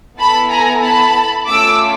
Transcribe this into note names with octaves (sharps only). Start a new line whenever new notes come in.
B3 E4 A4 A5 B5
G#5 A#5
A5 B5
A3 C#4 F4 D6 E6